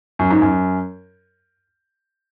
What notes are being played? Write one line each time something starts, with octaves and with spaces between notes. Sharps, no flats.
F#2
G#2
F#2